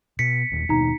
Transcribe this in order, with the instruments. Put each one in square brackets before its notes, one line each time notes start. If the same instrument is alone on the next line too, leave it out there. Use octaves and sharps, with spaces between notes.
[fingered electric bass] B2 [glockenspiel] B6 C#7
[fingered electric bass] E1 D#2
[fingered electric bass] D#2 B2 [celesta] D#4 A#5